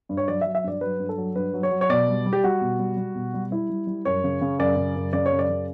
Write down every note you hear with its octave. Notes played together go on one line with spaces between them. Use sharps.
G2
C#5
F#3 D5
E5
F#3
E5
G2 D5
F#3 B4
G2
A4
F#3
G2 B4
F#3
C#5
F#3
C#5
B2 D5
G3
G3
G4
G3 F#4
B2
G3
G3
B2
G3
G3 E4
G3
G3
F#2 C#5
C#3
C#3
F#2 D5
C#3
F#2
C#3 D5
C#5
F#2
D5
C#3